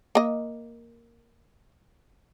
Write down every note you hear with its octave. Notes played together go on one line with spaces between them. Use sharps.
A#3 D#5